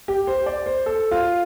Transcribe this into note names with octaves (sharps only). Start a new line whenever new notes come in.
G4
C5
D5
C5
A4
F4